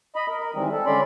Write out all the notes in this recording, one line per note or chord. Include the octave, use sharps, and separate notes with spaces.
D#5 B5
A#4
A#4
D#3 E3 G3 G#3 C4
A4
D3 G#3 C#4 D5 B5 C6